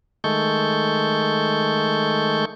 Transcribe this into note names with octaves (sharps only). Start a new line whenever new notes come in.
D#3 G#3 A3 A4 C#6 G6